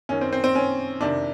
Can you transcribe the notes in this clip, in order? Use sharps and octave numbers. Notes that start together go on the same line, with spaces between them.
F#2 D#3 C#4
C4
C4
C4
C#4
F2 C3 D#3 D4